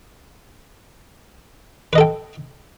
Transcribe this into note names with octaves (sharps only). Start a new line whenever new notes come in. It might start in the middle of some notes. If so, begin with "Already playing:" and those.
A4 B4 D#5 G5